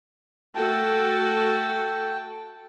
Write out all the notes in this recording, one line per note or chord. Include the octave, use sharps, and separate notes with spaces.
A3 F#4 A4 G5 A5